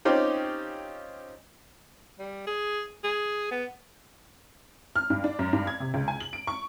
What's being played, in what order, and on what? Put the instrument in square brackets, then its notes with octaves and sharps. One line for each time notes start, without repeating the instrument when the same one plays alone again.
[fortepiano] C4 C#4 D#4 F4 G4
[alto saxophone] G3
G#4
G#4
B3
[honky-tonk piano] F6
G2
D4
F#2
G2
G#6
C3
C#2
G#5
F#7
D7
C#6